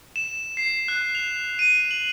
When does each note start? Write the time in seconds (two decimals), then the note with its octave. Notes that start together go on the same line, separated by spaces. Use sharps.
0.16 E7
0.57 C7
0.88 F#6
1.15 F7
1.59 D#7
1.91 F#7